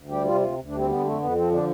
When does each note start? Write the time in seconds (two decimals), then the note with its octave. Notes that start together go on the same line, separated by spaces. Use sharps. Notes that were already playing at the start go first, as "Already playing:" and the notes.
Already playing: D2
0.09 G3 G4
0.25 C3 F4
0.40 D2 F4
0.56 D2
0.67 D4
0.72 G3
0.78 C4
0.88 D3 B3
1.04 F2 A3
1.19 F2 B3
1.35 F3 C4
1.51 D3 D4